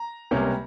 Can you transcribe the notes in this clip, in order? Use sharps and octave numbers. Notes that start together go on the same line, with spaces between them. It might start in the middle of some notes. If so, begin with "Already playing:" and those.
Already playing: A#5
C#2 C3 G3 A#3 C#4